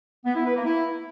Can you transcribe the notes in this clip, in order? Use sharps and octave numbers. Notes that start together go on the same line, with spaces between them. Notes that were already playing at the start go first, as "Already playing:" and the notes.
B3
E4
B4
A#3
E4